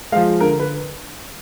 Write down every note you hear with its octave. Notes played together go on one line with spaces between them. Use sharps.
F3 G#3 F5
D3 A#4
B4